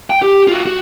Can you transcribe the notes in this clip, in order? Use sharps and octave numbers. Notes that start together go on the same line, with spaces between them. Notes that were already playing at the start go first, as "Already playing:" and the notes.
G5
G4
F4 F#4
F#4